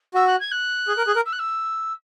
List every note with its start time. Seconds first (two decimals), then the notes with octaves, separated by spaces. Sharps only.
0.14 F#4 E6
0.27 F#6
0.40 G#6
0.51 F#6
0.88 G#4
0.98 A#4
1.07 G#4
1.16 A#4
1.25 E6
1.32 F#6
1.39 E6